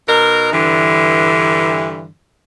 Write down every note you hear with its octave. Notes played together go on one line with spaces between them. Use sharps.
B2 D#4 A#4
G2 D3 E3